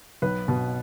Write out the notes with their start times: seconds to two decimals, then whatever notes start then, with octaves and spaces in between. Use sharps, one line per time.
0.22 B1 B4
0.48 B2